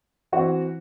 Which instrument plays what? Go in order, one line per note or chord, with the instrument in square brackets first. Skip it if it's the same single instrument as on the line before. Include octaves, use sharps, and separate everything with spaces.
[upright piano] E3 C4 F#4